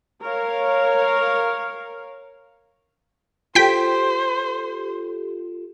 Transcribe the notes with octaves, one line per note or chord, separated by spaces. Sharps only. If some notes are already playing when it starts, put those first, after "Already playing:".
A#4 C#5 F5
F4 G4 A4 C5 G5 B6